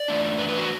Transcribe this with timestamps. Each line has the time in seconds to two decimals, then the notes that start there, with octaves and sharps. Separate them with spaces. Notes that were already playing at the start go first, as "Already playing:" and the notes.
Already playing: D5
0.08 E3 A3 D4
0.38 B4
0.49 B4
0.58 F#4